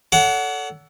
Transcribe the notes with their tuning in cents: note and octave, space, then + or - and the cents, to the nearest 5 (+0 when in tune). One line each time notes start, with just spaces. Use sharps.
A4 +0 C#5 +45 F#5 +0